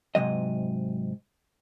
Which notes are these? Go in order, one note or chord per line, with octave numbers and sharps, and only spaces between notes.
G#2 C3 F#3 D#5